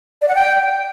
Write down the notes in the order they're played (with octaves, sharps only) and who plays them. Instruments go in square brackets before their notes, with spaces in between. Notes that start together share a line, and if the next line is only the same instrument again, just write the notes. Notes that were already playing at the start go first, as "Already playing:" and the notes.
[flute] D5
F#5
G5